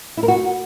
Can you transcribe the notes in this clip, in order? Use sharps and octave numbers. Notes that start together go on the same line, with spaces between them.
E4
A#4
F#4